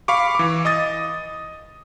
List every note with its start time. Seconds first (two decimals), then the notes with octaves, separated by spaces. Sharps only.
0.08 F5 B5 C#6 D6
0.35 E3 D6
0.65 D#5 D#6 A6